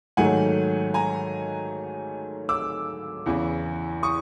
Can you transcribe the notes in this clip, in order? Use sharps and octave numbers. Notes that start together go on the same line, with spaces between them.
G#2 D#3 F#3 A3 F#5 G#5
G#5 A#5
D6 E6
E2 C#3 E3
C#6 D#6